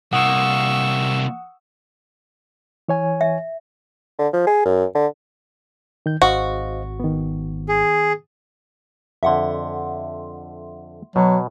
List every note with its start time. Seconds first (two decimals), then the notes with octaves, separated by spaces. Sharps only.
0.13 C2 C3 A#3 F#5 C#6 D#6 E6
2.88 E3 C#5 G#5
3.21 E5
4.19 D3
4.33 F3
4.47 G#4
4.65 F#2
4.95 D3
6.06 D#3 G6
6.22 G#1 F#4 C5 D#5 F5
7.00 D#3 B3
7.69 G#4
9.23 F2 D3 E5 F#5 C6
11.16 B2 F#3